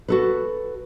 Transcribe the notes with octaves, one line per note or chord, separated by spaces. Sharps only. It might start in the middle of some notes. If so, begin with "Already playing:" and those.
F#4 A4 B4